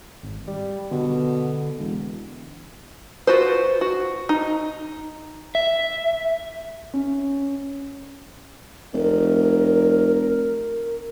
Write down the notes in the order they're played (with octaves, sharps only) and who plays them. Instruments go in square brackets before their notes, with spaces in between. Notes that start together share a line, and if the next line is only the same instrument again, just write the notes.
[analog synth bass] G#1
G3
[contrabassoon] B2 [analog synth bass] D3
[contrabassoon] E1
[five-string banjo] F4 F#4 B4 C5
F#4
D#4
[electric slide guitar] E5
[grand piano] C#4
[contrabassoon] F1 [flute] A#4